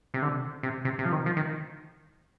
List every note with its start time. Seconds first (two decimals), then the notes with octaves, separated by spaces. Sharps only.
0.14 C3
0.22 D3
0.63 C3
0.85 C3
0.99 C3
1.05 F3
1.12 D#3
1.26 F3
1.37 D#3